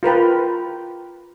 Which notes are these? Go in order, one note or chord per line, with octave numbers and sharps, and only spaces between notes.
F4 A#4 B4 G5